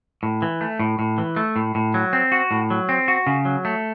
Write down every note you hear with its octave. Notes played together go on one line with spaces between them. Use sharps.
A2
E3
A3
A2
A2
E3
A3
A2
A2
F#3
C4
F#4
A2
F#3
C4
F#4
C#3
F#3
A3